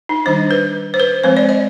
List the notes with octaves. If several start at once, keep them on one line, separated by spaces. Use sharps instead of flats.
D#4
D#3 G3 D4 C5
B4
C5
B4
F3 G#3 C4 C5
D5
D#5